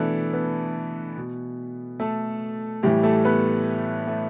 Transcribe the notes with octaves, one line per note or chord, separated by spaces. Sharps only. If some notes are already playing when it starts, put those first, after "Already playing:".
Already playing: B2 E3 A3 B3 D4 E4 A4 B4
B3 B4
B2
A3 A4
A2 E3 G3 G4
A3 A4
B3 B4
A3 A4